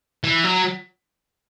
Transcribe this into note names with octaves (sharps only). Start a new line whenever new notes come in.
E3
F#3